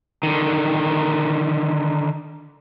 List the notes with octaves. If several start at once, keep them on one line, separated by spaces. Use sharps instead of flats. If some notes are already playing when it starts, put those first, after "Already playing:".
D3 D#3